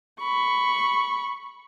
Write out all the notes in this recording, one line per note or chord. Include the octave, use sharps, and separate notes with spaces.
B5 C#6